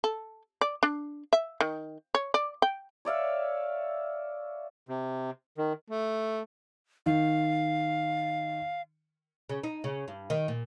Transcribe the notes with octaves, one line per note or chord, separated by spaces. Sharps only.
A4
D5
D4
E5
D#3
C#5
D5
G5
C#5 D5 E5 F5
C3
D#3
A3
D#3 F5
C#3
D#4
C#3
G2
D#3
A#2